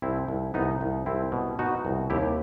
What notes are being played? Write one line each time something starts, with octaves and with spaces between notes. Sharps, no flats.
C2 C4 E4
C2
C2 B3 D#4
C2
C2 C4 E4
B2
B2 D#4 F#4
C2
D#2 E4 G4